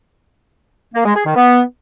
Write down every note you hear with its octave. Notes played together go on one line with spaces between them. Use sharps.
A#3
G#3
G#4
D#3
B3